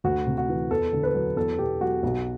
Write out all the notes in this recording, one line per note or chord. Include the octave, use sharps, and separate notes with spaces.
D2 F#4
C3
F#4
E3
E2 A4
D3
B4
F#3
E2 A4
B2 G4
F#3 F#4
B1